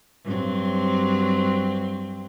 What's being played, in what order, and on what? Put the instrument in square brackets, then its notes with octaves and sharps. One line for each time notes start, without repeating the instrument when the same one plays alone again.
[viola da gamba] G2 F#3 C4